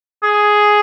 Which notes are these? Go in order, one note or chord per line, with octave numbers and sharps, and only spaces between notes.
G#4